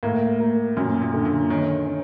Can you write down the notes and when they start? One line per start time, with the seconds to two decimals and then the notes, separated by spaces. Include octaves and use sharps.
0.03 A2 A#3
0.40 A#3
0.77 F#2 A#2
1.01 A#2
1.14 D3
1.25 A#2
1.49 D#3 C#4
1.86 C#4